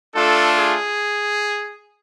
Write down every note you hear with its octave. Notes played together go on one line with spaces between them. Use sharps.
A3 D4 F4 A4
G#4